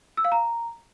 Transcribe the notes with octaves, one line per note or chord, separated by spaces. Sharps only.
E6
F5
A#5